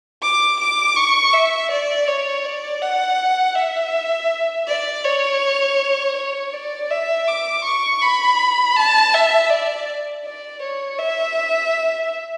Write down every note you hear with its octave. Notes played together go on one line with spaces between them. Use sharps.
D6
D6
C#6
E5
D5
C#5
D5
F#5
E5
D5
C#5
C#5
D5
E5
D6
C#6
B5
A5
E5
D5
D5
C#5
E5